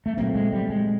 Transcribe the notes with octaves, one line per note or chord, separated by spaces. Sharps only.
A3
A#2 F#3 A3 A#3 C4
G#3
G3
G#3